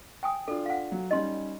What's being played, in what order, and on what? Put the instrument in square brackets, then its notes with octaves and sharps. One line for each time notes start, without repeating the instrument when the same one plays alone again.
[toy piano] G5 G#5 D#6
[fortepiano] D4 F4 [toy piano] A4
[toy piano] F5 F#5
[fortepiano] F#3
[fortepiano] G3 C#4 D#4 [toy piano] D#5 C6